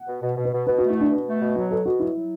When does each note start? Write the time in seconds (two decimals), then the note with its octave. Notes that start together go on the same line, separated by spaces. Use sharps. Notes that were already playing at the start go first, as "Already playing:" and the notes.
Already playing: F#5
0.08 B2
0.22 B2
0.37 B2
0.45 B4
0.53 B2
0.67 B2 B4
0.78 A3 F#4
0.90 E4
0.97 B2 D4
1.11 B2
1.26 A3
1.41 B2
1.56 F#3 F#4
1.71 B2 A4
1.85 B2 F#4
2.00 F#3 E4
2.14 F#3